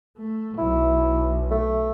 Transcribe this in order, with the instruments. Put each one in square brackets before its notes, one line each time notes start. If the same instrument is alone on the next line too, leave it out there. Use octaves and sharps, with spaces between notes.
[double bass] A3
[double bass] B1 [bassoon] E4
[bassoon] A3